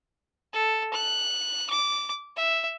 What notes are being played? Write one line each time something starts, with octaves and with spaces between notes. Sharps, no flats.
A4
F#6
D6
E5